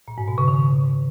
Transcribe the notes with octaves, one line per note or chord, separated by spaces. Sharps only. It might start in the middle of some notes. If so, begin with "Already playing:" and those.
A#2
G#2
B2
C#3
D#3